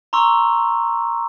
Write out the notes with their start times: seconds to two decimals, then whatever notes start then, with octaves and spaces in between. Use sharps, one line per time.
0.13 A#5 C6 C#6 E6